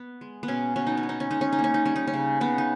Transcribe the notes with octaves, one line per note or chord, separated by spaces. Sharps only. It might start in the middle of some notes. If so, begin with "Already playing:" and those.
Already playing: B3
G#3
B3
B2 C#4
B2 C#4
D#4
C#4
B3
D#4
C#4
G#3 D#4
C#4
D#4
A#3
C#4
D#4
G3 C#4
D#4
C#4
C#3
C#3 B3
D#4